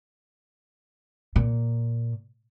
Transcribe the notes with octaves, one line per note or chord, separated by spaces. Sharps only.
A#2